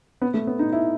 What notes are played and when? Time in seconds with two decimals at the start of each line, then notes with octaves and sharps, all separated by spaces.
0.22 B3
0.34 A3
0.47 B3
0.59 D#4
0.73 E4